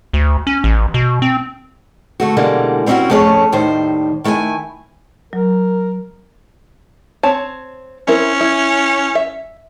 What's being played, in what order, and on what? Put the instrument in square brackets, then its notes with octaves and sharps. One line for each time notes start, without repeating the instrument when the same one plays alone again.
[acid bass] D2
C#4
A1
B2
C4
[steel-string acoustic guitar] D3 A3 F#4
B2 D3 E3 G3 G#3 A#3
G3 C4 C#4 D#4 E4 F#4
F2 A3 C#4 G#4 C#5
D#2 A2 D#3 G3 C5
D#3 A3 E4 G5 G#5
[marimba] F#3 [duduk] A#4
[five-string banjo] C4 C#5 A5
[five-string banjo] C4 E4 A#4 [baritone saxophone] C#4
[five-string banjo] E4
E5